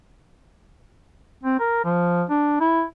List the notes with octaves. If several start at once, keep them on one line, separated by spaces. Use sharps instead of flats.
C4
A#4
F3
D4
E4